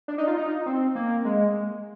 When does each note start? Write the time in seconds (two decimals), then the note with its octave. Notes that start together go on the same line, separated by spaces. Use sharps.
0.08 D4
0.18 D#4
0.27 F4
0.37 D#4
0.66 C4
0.95 A#3
1.25 G#3